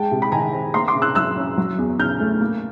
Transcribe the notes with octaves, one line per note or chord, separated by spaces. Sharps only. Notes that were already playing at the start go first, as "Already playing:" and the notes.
Already playing: G#3 G5 A5
C3
B5
D#3 G#5 A#5
C4
A#3 A#5 C6
C6 D6
C#3
E6 F#6
F#3 E6 F#6
C#4
F#3
E2
C#3 F6 G6
A3
A#3